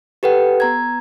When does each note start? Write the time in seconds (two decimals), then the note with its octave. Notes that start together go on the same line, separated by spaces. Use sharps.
0.23 G4 A4 B4 F#5 G5
0.60 B3 A#5 G#6